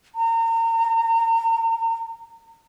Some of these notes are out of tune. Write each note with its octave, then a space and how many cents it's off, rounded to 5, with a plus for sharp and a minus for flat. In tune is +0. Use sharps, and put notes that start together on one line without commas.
A#5 -35